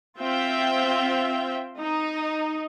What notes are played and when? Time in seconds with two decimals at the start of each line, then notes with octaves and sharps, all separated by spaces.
0.18 C4 F4 E5 G5
1.79 D#4